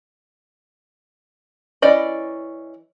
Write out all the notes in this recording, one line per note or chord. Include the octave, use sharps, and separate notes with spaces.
E3 C#4 D5 D#5 B5